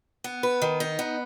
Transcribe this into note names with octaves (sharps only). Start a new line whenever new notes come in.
B3
B4
D#3
D#4
B3